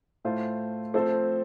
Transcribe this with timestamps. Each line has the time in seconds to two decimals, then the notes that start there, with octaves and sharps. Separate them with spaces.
0.25 A2 A3 F4 C5
0.94 F3 A3 C4 A4 C5